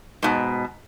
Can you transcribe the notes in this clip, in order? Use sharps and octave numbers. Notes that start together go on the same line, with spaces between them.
G#2 B2